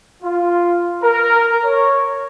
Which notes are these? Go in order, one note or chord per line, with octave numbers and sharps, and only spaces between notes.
F4
A#4
C#5